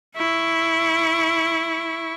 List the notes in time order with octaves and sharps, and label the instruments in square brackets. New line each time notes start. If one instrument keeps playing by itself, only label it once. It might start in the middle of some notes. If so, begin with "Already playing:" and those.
[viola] E4 C#6